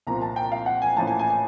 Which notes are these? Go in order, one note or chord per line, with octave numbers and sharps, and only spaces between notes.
C2 A#2 F3 A#5
A5
G5
F5
F#5
G#5
A1 A2 F3 A#3 A5
G#5
G#5
G#5